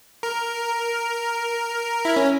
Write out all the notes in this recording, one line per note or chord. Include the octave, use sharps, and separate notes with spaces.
A#4
E4
C#4